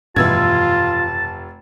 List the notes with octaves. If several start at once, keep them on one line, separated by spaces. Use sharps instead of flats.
F1 G2 B2 E3 F4 A5 E6 G#6